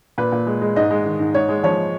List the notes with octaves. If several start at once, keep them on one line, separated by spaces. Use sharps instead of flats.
A#2 B4
A#2
G#3
G#3
G#2 D#5
G#3
D#3
G#2
G#2 C#5
G#3
F3 C#5